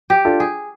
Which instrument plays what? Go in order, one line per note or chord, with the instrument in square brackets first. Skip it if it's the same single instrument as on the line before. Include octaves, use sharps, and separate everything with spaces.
[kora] G4
[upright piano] D4 F4 A4
[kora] G#4